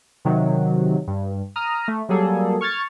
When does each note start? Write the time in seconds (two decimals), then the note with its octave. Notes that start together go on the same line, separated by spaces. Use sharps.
0.25 C3 D#3 F#3
1.07 G2
1.56 A#5 D#6 F6
1.88 A3
2.09 F#3 G3 A#3 G#4 A4
2.61 C#6 F6 G#6 A6 C#7